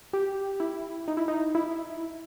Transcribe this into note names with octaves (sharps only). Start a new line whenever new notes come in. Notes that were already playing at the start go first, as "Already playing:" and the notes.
G4
E4
D#4
E4
D#4
E4